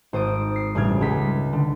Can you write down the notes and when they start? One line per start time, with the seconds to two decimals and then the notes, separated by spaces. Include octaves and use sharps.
0.13 G#1 C5 D#6 D7
0.56 C7
0.75 A1 G2 C#3 F6 G#6
1.01 C#2 G#3 B6
1.53 D3